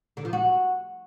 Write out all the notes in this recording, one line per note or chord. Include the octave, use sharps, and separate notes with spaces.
D3
F3
F#4